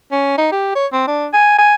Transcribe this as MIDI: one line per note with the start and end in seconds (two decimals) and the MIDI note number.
0.12 0.34 61
0.38 0.48 63
0.52 0.73 67
0.75 0.86 73
0.93 1.07 60
1.08 1.28 62
1.33 1.56 80
1.58 1.75 80